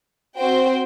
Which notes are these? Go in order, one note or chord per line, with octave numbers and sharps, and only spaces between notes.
C4 F#4 C5 G5